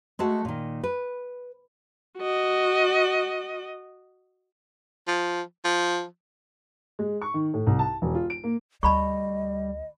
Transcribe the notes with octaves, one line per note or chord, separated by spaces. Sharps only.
G#3 A3 F#4 A5
A#2 D#3
B4
F#4 D#5
F3
F3
G#3
C#6
D#3
A2
C2
A5
E1
F4
D7
A#3
D2 G3 D#5 A5 B5 C#6